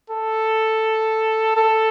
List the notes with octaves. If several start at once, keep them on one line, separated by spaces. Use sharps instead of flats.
A4
A4